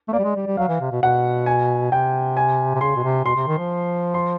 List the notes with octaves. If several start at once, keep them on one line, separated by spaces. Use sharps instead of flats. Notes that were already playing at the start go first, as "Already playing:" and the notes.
A3
A#3 D5
G3
G#3
G3
G3
F#3 F5
E3
C3
B2
B2 F#5
G#5
C3 G5
G#5
C3
C#3 C6
B2
C3
B2 C6
C3
D#3
F3
C6